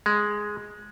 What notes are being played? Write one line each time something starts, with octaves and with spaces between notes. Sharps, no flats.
G#3